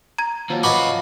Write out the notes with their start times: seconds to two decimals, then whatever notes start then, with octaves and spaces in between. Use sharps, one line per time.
0.18 A#5 G#6
0.50 D#2 F3 F#3
0.63 C#3 F#4 B4 D#5 B5 D6